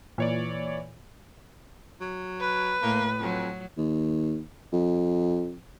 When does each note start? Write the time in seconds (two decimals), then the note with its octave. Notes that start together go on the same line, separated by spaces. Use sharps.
0.18 A#2 E3 C#5 D5
2.01 F#3
2.40 B4
2.82 A2 A#3
3.21 F2 F#3
3.78 D#2
4.73 F2